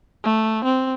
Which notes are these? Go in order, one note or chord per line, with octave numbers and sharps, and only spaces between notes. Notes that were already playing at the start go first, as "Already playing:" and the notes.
A3
C4